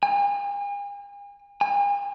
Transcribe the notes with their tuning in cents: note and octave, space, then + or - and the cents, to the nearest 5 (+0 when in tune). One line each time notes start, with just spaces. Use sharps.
G#5 -45
G#5 -45